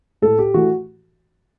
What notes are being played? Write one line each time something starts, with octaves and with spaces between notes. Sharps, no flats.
A2 A4
G4
E3 A3 F#4